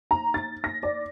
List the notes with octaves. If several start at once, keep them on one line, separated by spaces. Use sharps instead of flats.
A#5
A6
A#6
D5